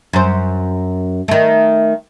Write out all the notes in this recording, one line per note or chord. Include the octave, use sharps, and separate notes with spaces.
F#2 C5
D#3 A3